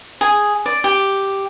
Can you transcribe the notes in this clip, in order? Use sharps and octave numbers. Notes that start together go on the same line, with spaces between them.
G#4
D5
G4